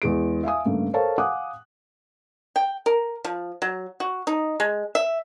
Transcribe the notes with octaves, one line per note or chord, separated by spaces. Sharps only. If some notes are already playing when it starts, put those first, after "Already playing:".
E2 G#3 D7
E5 F5 G#5 D#6
G2 C#3 A3 A#3
A4 A#4 C5 C#5 F5 A5
F5 F#5 G#5 D6 D#6 F#6
G5
A#4
F3
F#3
F#4
D#4
G#3
E5